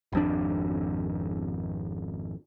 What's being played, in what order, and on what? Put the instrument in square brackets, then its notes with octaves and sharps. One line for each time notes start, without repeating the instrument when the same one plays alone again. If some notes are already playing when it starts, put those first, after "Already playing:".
[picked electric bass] G#1 F2 D4